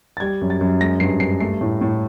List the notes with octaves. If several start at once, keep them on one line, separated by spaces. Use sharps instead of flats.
A6
G3 G#6
F#2
A6
F#2
G#3 A#6
G2 C7
G2 C7
A3 C7
A2
A2